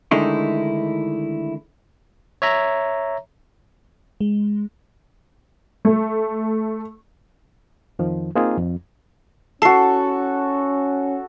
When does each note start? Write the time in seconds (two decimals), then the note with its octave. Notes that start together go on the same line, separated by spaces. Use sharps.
0.11 D3 D#3 G#3 A3 D#4 E4
2.42 C#5 E5 A#5
4.21 G#3
5.85 A3
7.99 F2 D#3 F3
8.35 A#3 C4 D#4 F4 G#4
8.57 F2
9.62 C#4 F#4 A4 A5 C7